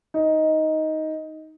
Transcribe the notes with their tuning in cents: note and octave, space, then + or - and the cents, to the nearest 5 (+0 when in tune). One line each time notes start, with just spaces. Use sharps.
D#4 +10